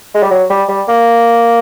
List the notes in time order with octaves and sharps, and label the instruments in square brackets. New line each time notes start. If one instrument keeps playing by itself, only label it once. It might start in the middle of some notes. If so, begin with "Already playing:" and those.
[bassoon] G#3
G3
F#3
G3
G3
A#3